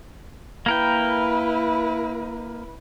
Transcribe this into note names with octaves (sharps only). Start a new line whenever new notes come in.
A#3 E4 A#4 B4 G5